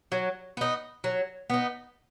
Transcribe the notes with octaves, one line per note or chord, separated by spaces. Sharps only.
F#3
B3 D#4
F#3
B3 D#4